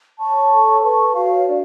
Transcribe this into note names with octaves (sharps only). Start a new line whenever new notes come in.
C#5 A5 C#6
A4
B4 A5 C#6
F#4 C#5 F5
D4 D5